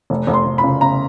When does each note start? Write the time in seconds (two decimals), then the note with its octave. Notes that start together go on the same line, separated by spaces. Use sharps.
0.10 F1
0.27 F1
0.34 C6
0.46 F1
0.58 B5
0.64 C#3
0.81 C#3 A#5